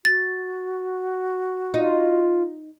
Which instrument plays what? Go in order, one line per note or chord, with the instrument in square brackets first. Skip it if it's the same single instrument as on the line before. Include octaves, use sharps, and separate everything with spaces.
[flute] F#4 [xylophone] A6
[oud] D#4 [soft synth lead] F4